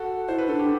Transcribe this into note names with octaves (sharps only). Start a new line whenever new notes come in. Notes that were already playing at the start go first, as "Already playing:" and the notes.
Already playing: F#4 A4
E4 C5
B4
D4 A4
G4